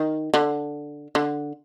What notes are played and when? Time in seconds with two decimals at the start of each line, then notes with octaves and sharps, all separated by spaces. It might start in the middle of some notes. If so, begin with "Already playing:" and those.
Already playing: D#3
0.34 D3
1.15 D3